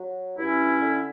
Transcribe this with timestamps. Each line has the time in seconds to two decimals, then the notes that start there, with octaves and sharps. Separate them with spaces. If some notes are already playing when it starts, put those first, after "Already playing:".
Already playing: F#3
0.37 G2 C#4 E4
0.81 D3